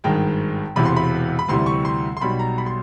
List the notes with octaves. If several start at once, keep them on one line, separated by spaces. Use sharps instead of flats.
G#1 G2 D#3 G#3 G5
E1 E2 C3 E3 B5
C6
B5
B5
D2 C3 E3 G3 C6
C#6
C6
C6
B1 B2 G3 B5
A#5
B5
C6